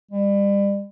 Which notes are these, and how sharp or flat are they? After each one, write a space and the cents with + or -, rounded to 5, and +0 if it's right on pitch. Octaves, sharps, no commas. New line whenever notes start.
G3 +35